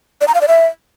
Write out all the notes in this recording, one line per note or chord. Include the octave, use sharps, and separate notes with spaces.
D5
A#5
F5
D5
E5